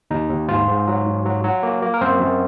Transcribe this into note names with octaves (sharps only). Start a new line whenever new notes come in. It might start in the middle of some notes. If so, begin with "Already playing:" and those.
D#2 D#4
D#2
G#2 F4
G#2
F#3
G#2
F#3
F#3
A#3
A#3
A#4
F#2 C4 C5
F#2